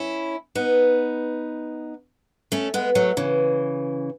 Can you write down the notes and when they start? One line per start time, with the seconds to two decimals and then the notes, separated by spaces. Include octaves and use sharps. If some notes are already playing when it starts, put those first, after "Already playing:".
Already playing: C#4 E4
0.55 B3 D#4
2.52 A3 C#4
2.74 G#3 B3
2.95 F#3 A3
3.17 C#3 E3